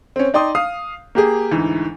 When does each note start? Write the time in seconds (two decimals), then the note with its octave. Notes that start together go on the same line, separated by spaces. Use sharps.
0.16 C4 C#4
0.34 D#4 D5 G5 C6 D#6
0.55 F5 D#6
1.15 A#3 G4 G#4
1.51 D2 G#2 E3